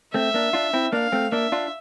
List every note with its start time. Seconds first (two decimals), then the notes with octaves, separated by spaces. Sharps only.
0.14 A3 C4 E5
0.34 A#3 D4
0.53 D4 F4
0.73 C4 E4
0.92 A#3 D4 F5
1.12 A3 C4
1.32 A#3 D4 E5
1.52 D4 F4